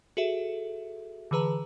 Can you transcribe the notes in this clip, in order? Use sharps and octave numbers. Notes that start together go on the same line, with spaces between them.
F#4 G#4 A4 E5
D3 E3 G#4 B4 A#5